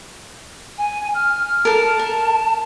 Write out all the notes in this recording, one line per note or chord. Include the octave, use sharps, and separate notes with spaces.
G#5
F6
A4 A#4 A5
A#4